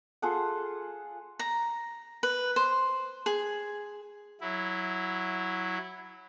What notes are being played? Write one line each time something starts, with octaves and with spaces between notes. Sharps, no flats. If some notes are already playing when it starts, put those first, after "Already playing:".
F4 G#4 A4 F#5
A#5
B4
C5
G#4
F#3 E4